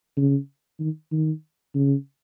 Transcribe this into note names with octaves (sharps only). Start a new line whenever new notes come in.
C#3
D#3
D#3
C#3